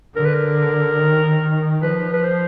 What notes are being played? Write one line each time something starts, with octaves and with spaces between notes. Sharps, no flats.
D3 A#4
B4
A#4
D#3
F3 B4
B4
C5